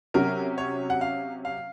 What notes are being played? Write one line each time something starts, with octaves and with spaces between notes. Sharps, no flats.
C3 F#3 C#4 A#4
C#5
F#5
F5
F5